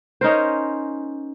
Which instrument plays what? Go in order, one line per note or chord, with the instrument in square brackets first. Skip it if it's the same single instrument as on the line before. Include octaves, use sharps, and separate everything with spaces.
[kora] C#4 D#4 A#4 C5